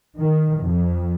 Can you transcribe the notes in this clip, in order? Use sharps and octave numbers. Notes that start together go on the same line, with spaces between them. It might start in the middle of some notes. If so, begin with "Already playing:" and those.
D#3
F2